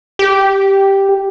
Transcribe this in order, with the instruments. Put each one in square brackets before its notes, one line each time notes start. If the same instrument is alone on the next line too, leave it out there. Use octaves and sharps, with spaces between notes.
[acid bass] G4